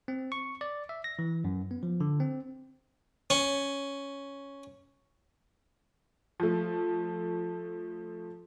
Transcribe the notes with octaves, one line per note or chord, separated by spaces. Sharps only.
C4
C#6
D5
E5
A#6
E3
F#2
B3
F3
D3
C4
C#4
F3 A3